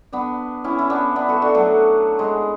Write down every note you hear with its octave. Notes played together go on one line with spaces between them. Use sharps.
B3 D4
C#4 E4
E4
B3 D4
B3 D4
F#4 A4
D4 F#4
F#3 A3
G#3